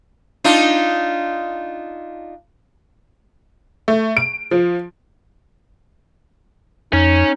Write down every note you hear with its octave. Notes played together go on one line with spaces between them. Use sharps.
D4 D#4 F4
A3
D7
F3
F2 C#4 D#4